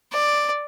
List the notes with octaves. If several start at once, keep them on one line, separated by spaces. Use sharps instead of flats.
D5